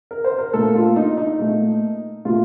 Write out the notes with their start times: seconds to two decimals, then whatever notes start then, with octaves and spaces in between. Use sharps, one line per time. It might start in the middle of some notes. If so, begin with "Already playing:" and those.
0.11 A#4
0.24 C5
0.38 A#4
0.53 A#2 A3 A4
0.75 F4
0.96 D#4
1.18 D#4
1.39 A#2 A3
2.25 A#2 A3 F4